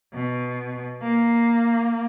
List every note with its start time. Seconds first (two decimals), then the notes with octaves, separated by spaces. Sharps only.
0.14 B2
1.02 A#3